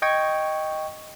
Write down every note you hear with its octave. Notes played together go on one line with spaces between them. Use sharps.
D#5 G5 C#6 G#6